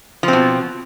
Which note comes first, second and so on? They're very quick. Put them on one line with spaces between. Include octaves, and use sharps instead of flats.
F3 C4 B2